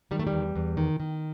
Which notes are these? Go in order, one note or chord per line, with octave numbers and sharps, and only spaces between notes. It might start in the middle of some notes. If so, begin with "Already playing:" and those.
D#3 G3
A3
G3
E2
E2
D#3
D#3